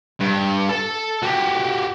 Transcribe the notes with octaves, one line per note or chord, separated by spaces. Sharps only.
G2
A4 A5
F#4 G4